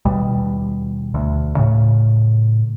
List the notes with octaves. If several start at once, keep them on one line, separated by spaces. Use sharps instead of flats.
D#2 B2 G3
D2
A2 C#3